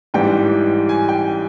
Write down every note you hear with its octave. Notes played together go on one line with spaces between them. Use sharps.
A1 G#2 E3 G3 G5
G#5
G5